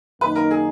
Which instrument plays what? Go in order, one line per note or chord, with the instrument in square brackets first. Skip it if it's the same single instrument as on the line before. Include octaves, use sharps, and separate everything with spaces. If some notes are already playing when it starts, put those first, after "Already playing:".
[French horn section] F#2 D#3 A#3 D#4 [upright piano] B4
[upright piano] A#4
G#4